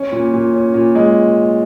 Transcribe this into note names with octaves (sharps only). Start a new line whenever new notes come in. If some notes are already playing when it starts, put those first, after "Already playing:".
Already playing: C#4
A#2
A#2
C#4
A#2
G#3